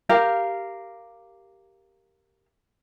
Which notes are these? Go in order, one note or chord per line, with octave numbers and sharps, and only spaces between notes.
G4 A#4 F5